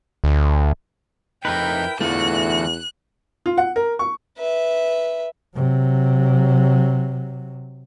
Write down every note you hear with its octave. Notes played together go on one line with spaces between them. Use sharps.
D2
F2 D#4 E4 A#4 B4 G5
E2 D3 E3 A3 F4 F#4 F#6
F4
F#5
A#4
C#6
B4 E5
C3 F#3